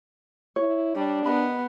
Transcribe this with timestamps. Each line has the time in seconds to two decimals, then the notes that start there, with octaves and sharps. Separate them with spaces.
0.56 E4 C#5
0.95 G3 D4
1.26 B3 A#4 D#5 B5